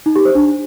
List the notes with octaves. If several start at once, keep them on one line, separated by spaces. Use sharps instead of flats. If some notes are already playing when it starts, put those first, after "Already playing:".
D#4
G4
C5
D4